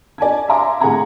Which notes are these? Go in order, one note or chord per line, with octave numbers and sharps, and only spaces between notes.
D5 G#5 A5 G#6
E5 F5 G#5 A#5 C6 D6
A2 G#4 F#5 G#5 A#5 G#6